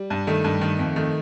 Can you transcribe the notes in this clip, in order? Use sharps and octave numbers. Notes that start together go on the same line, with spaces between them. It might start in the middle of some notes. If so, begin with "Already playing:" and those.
Already playing: G3
G2
D#3 A3
G2
D#3
F2
D#3 A3